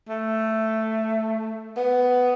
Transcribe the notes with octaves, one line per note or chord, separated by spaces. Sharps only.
A3
B3